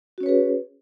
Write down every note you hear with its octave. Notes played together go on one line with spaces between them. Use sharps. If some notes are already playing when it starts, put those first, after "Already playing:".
C#4 F#4 G#4 B4 C#5